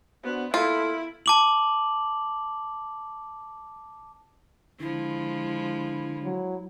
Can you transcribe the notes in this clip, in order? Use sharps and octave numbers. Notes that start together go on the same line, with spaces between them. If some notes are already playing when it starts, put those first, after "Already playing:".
B3 D4 F#4 C5
A#3 E4 F4 A4
A5 D6 F#7
D3 F3 G#3 E4
F#3